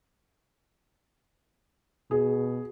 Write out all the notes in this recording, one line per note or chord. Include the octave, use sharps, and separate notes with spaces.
B2 G#4